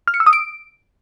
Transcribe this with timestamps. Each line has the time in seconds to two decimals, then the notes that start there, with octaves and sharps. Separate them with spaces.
0.08 F6
0.14 C#7
0.20 E6
0.26 D#6
0.33 D7